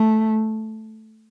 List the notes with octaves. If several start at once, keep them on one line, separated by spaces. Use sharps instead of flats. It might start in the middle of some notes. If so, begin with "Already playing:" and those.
Already playing: A3